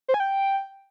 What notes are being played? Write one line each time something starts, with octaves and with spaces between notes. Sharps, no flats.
C5
G#5
G5